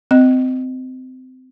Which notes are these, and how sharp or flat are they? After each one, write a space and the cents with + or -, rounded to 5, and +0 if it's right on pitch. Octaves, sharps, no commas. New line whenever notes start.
C4 -25 D#5 -5